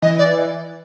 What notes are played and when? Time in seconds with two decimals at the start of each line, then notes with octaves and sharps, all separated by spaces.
0.02 E3 D#5
0.19 D5